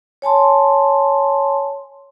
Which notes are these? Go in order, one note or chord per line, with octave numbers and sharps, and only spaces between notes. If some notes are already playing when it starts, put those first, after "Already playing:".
C#5 G#5 A5 C6